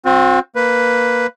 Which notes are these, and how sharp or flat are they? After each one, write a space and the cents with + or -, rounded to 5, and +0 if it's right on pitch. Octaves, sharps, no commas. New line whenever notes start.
C4 +10 F#4 -40
A#3 +0 B4 +0